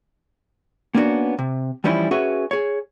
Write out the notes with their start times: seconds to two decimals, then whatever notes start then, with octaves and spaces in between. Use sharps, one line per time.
0.95 A#3 B3 C#4 D4 F4 F#4
1.39 C3
1.84 E3 F3 G3 C#4 D#4 E4
2.11 C#4 F#4 G#4 B4 E5
2.51 G#4 C#5